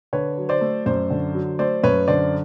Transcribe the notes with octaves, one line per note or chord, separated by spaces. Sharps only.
D3 B4 C#5
F#3
C5 D5
A3
F#2 C5 D5
D3
F#3
A3 C5 D5
F#2 B4 C#5
D3 C5 D5